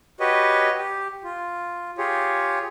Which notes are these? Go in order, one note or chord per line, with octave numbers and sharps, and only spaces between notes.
F#4 G4 B4 C#5 D#5
G4
F4
F4 G4 G#4 C#5